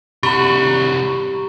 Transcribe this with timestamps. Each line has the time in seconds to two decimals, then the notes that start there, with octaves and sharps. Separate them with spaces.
0.23 C2 F#4 G4 A#5 B5 C#6